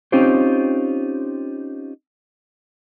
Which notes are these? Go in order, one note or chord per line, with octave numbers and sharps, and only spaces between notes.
C4 C#4 D#4 F4 G4 C5